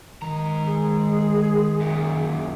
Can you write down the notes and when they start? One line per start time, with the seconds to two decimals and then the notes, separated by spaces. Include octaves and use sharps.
0.22 D#3 G#3 A#5
0.67 G#4
1.80 F#2 A#2